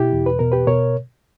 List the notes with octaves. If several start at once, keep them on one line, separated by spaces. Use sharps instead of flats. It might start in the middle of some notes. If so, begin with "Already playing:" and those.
Already playing: B2 E4 G4
E2
B4
B2 A#4
G4 B4
B2 A#4 C#5